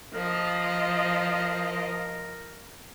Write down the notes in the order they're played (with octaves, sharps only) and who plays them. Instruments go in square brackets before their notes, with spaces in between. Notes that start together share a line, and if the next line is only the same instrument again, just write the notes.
[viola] F3 D#5 [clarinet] A#4